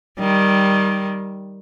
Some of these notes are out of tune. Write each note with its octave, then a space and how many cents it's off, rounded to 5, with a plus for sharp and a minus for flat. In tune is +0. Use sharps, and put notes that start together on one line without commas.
D#3 +0 G3 -5